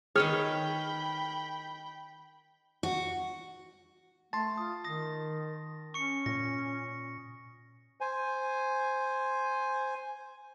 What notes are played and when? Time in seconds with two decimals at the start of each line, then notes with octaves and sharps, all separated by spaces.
0.16 D#3 G#4 B4 C#5 G5 B5 F6
2.83 F#4
4.33 A3 A5 C6 A6
4.58 F4 D#6
4.84 D#3 D#6 A#6
5.94 C#4 C#6 C#7
6.26 A#2 A#6
8.01 C5 G#5